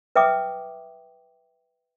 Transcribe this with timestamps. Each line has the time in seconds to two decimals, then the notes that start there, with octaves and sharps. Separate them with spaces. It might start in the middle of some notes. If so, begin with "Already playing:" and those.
0.16 B4 E5 G5 D6 D#6